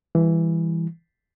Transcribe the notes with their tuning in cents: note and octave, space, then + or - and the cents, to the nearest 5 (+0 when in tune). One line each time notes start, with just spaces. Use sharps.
E3 +5 G3 +35